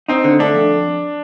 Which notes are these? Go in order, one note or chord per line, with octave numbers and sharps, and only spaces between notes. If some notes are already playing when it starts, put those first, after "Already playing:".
C4 D#4
D3
A3 D4
F2